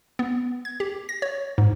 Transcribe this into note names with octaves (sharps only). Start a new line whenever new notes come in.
B3
G#6
G4
A#6
C#5
G#2